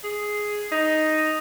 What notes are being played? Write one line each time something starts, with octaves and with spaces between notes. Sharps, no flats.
G#4
D#4